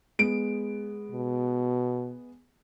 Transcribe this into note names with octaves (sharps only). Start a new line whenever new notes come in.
G#3 B3 D7
B2